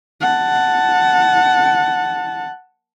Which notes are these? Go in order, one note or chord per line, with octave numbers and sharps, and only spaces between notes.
F#5 A5